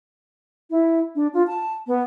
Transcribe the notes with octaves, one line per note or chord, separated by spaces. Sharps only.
E4
D4
F4
A5
B3